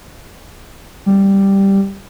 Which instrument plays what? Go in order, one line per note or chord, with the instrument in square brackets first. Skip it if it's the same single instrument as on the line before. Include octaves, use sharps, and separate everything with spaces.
[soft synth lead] G3